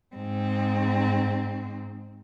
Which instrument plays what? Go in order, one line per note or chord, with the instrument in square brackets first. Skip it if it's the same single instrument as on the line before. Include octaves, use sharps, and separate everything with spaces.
[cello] G#2 C4